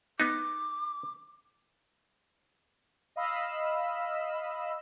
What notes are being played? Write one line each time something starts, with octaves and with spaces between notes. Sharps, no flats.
B3 D#4 D6
D#5 F5 B5 E6